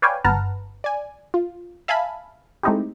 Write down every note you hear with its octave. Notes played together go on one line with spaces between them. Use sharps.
B4 C#5 D5 F5 G5 G#5
G1 B4 F#5 A5 A#5 F6
D5 G#5
F4
E5 F5 G#5 A5 B5
G#3 A3 C4 D#4 E4 G4